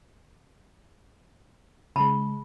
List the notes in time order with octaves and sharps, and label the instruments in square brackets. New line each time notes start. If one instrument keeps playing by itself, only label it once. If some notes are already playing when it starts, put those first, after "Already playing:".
[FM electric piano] C#3 G#3 [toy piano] A5 B5